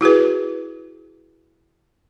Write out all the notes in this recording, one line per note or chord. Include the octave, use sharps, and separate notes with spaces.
E4 F#4 G#4 B4